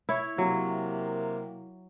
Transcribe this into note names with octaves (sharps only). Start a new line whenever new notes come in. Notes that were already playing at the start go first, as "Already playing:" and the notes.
E4 C#5
C3 F#3 A#3